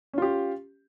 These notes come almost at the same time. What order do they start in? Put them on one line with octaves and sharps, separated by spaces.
C#4 F4 G4